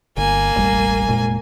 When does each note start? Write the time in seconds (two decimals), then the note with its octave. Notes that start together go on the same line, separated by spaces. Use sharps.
0.17 G1 A#3 G#5
0.55 E1 A1 G3
1.08 F1 A#2 G#3